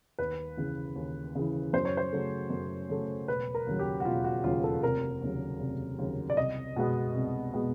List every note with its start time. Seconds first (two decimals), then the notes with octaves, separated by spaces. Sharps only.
0.19 D#2 B4
0.57 C#3 E3
0.96 D#2
1.35 C#3 E3
1.73 F#2 C5
1.85 C#5
1.97 C5
2.12 C#3 F#3 A3
2.50 F#2
2.89 C#3 F#3 A3
3.28 E1 B4
3.54 A#4
3.67 D#2 C#3 F#3
3.79 G4
4.00 F#4
4.05 E1 F4
4.24 F#4
4.44 D#2 C#3 F#3 F4
4.64 A4
4.83 F1 A#4
5.22 D#2 C#3 F#3
5.60 F1
5.99 D#2 C#3 F#3
6.30 D5
6.37 C2 D#5
6.76 B2 G#3 B3
7.14 C2
7.54 B2 G#3 B3